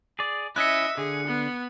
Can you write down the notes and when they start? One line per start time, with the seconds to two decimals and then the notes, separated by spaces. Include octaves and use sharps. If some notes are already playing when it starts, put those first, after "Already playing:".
0.19 G#4 D5
0.56 C#4 E4 D#5 E5 F#6 C#7
0.97 D3 G#4
1.27 B3